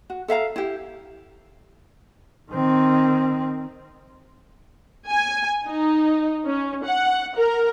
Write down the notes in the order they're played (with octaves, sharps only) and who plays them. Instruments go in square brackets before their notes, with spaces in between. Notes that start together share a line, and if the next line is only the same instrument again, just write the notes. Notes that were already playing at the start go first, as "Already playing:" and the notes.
[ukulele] F#4
A4 E5 F5 A#5
E4 G4
[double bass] D#3 C4
[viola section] G#5
D#4
C#4
F#5
A#4